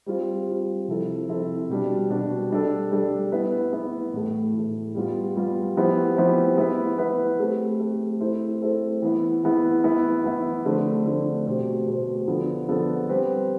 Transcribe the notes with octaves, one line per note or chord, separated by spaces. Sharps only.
G3 C4 F4
G3 C4 F4
C3 F3 C4 E4 A4
C3 F3 C4 E4 A4
B2 G3 D4
B2 G3 D4
G3 D4 A4
G3 D4 A4
B3 E4 B4
B3 E4 B4
A2 E3 A3
A2 E3 A3
G3 B3 F4
G3 B3 F4
F3 B3 E4 G4 C5
F3 B3 E4 G4 C5
B3 E4 B4
B3 E4 B4
A3 C4 G4
A3 C4 G4
A3 C4 E4 A4 C5
A3 C4 E4 A4 C5
E3 B3 E4
E3 B3 E4
E3 B3 E4
E3 B3 E4
D3 F3 A3 C4
D3 F3 A3 C4
B2 A3 C4 G4 C5
B2 A3 C4 G4 C5
D3 F3 B3 F4 A4
D3 F3 B3 F4 A4
G3 C4 G4 B4